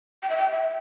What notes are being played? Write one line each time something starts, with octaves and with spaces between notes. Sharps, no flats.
G5
E5
G5
E5